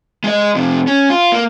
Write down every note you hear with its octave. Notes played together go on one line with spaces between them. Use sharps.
G#3 D#5
F2 C3
C#4
F4
A#3